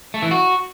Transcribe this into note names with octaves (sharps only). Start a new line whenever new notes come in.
A3
E3
F#4